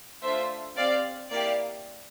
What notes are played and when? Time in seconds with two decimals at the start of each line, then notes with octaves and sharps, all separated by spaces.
0.22 A3 D4 F4 C5 E5
0.76 C4 G4 D5 F5
1.31 A#3 E4 G4 D5 F5